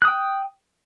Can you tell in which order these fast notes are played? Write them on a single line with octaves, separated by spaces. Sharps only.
F#6 D#6 G5